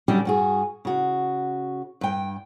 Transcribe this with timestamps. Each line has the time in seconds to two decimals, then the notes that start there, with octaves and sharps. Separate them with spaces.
0.08 D3 F#3 G3 C#4 D4 G4
0.25 G2 F#4 G#4
0.85 C#3 F#4
2.01 G2 G5